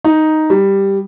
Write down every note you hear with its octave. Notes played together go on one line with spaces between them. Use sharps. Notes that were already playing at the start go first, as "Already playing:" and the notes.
D#4
G3